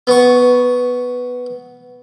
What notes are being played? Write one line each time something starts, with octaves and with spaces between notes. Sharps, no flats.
B3 C#6